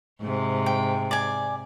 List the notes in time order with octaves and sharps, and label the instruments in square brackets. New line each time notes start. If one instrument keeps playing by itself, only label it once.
[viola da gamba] G#2 C3
[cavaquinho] G5
D5 G#5